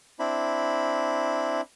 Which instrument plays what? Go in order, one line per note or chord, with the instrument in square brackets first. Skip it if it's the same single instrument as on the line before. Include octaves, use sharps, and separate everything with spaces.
[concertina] C4 D4 E4 B5